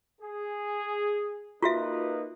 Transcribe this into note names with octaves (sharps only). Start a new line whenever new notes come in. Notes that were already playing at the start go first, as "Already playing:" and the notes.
G#4
A#3 D#4 F4 F#4 B4 E5